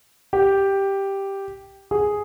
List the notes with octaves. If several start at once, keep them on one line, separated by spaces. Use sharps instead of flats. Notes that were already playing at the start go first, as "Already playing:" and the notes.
G4
G#4